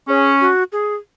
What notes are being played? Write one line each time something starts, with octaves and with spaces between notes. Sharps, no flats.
C#4 G#4
F#4
G#4